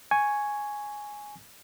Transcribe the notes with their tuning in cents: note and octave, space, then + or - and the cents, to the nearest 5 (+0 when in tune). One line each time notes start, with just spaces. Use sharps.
G#5 +0 C#6 +0